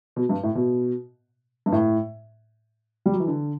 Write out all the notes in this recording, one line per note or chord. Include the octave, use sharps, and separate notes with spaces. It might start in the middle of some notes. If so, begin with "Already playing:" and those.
B2
G2
A2
B2
G2
A2
G3
F#3
E3
D3